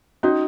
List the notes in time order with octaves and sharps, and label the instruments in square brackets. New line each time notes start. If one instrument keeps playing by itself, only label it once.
[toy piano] C#4 F#4 C#5 [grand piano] D#4